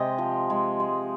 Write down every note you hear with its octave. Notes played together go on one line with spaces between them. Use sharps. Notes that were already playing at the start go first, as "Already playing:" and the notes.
Already playing: C3 G#3 D#5 G5
F3
G#3
G#3